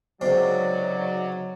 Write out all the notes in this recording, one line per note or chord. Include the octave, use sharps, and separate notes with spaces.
C#2 C3 F#3 D#4 D5